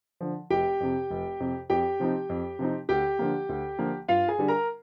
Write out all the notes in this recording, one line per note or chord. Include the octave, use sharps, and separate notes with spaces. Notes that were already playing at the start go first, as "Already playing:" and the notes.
D3 F3
F1 G4 G5
F2 C3
F1
F2 C3
F2 G4 G5
C3 F3 C4 D#4
F2
C3 F3 C4 D#4
D2 G4 G5
D3 F3 A#3
D2
D3 F3 A#3
G2 F4 F5
G#4 G#5
D3 G3 D4
A#4 A#5